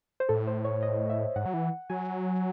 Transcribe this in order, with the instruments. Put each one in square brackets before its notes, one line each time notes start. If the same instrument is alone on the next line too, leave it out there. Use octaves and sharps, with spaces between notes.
[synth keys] C5
[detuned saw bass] A2 [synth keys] A4
[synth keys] C5
C#5
D#5
E5
[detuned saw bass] G#2 [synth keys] F#5
[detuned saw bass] F#3
E3
[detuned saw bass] F#3 [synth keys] G#5